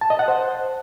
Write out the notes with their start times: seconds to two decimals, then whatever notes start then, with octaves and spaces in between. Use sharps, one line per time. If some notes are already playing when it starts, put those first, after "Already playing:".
0.01 A5
0.10 D#5
0.19 F#5
0.28 C5